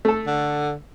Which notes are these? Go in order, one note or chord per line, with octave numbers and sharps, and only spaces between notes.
A3 A4
D3